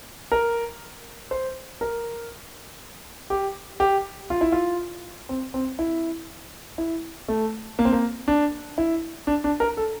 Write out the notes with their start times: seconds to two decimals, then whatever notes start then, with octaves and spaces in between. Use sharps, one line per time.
0.32 A#4
1.31 C5
1.81 A#4
3.30 G4
3.80 G4
4.30 F4
4.41 E4
4.52 F4
5.29 C4
5.54 C4
5.79 E4
6.78 E4
7.28 A3
7.79 A#3
7.85 C4
7.93 A#3
8.28 D4
8.78 E4
9.27 D4
9.44 D4
9.60 A#4
9.77 A4